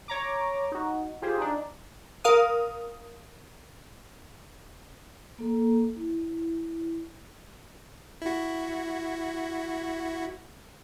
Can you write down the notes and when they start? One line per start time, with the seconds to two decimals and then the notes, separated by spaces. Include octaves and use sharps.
0.08 C#5 A#5 D6
0.72 D#4 F#4
1.22 F4 G4 G#4 C5
1.38 D4 D#4
2.24 A#4 F5 D#6
5.39 A#3 A4 A#5
5.97 E4
8.22 E4 F#4